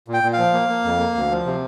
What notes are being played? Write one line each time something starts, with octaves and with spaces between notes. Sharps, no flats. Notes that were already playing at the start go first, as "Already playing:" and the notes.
A#2
G5
A#2
F5
F3
A#3
A#3
F2
A#3
D2
F3
C3